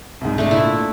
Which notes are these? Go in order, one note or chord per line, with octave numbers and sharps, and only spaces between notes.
C2 G#2
A3 D4
A#2 E4